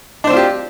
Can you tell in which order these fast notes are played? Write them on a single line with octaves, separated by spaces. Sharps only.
D4 C5 C4 F4 G4